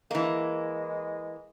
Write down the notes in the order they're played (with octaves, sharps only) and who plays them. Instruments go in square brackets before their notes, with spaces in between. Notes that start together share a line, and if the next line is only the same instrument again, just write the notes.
[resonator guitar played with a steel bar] E3 A#3 [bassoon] G#3